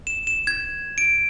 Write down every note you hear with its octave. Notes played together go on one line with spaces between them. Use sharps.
E7
E7
G#6
D7